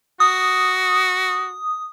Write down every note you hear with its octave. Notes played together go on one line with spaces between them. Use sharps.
F#4 D#6